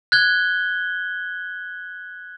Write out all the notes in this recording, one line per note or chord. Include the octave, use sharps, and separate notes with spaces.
F#6 G#6 G7